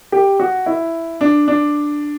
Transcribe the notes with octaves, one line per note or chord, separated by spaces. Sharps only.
G4
F#4
E4
D4
D4